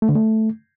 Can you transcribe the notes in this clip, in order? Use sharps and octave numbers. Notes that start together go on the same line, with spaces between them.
A3
D3
A3